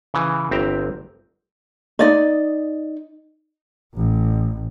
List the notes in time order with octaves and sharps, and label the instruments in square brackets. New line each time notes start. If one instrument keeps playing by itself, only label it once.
[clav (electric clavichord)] C#3 E3
G1 C4 E5 G5 A#5
[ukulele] D#4 D5 D#5
[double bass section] A1